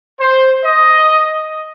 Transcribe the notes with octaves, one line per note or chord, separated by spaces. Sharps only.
C5
D#5